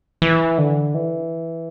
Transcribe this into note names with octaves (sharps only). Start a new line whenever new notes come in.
E3
D3
E3